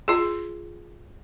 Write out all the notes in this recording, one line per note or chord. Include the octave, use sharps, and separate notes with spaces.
F4 G#4